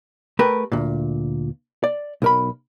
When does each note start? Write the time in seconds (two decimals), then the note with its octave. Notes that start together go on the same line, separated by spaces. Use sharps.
0.39 A3 G4 A#4 B4
0.72 D2 A#2
1.84 D5
2.22 B1 A#4 B5